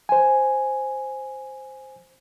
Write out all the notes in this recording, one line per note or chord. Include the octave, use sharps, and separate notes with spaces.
C5 G#5